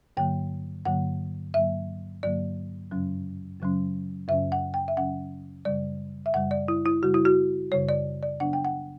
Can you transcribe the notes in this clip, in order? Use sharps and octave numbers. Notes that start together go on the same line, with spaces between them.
G2 D3 F#3 A#3 G5
G2 D3 F#3 A#3 F#5
G2 D3 F#3 A#3 E5
G2 D3 F#3 A#3 D5
F#2 C#3 F#3 C#4
F#2 C#3 F#3 C#4
F#2 C#3 F#3 C#4 E5
F#5
G5
E5
F#2 C#3 F#3 C#4 F#5
F#2 C#3 G3 D5
E5
F#2 C#3 G3 F#5
D5
E4
E4
F#2 C#3 G3 F#4
E4
F#4
F#2 C#3 G3 C#5
D5
D5
C#3 F#3 B3 D4 F#5
G5
F#5